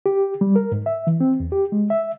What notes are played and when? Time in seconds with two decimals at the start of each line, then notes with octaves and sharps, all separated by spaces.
0.06 G4
0.41 G3
0.56 A#4
0.72 G#2
0.86 E5
1.07 E3
1.20 C4
1.40 E2
1.52 G4
1.72 G#3
1.90 E5